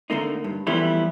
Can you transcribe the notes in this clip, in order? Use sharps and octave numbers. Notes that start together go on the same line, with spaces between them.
D3 A3 A#3 D#4
G2
E3 F3 G3 A3 B3 E4